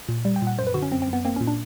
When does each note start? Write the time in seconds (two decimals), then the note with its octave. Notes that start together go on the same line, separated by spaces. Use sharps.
0.09 A#2
0.25 G3
0.36 G5
0.42 A#2
0.47 F#5
0.58 F#2 C5
0.67 B4
0.74 D3 F#4
0.82 C#4
0.91 F#2 C4
1.02 C4
1.08 F#2
1.13 B3
1.25 A#3 C4
1.36 C#4
1.41 A#2
1.47 D4